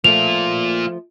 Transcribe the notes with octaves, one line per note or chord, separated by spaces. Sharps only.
F3 A3 A#3 F4 F7